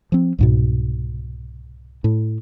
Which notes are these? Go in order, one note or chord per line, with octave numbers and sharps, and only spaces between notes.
F3 C4
C2 G#2 B2
A2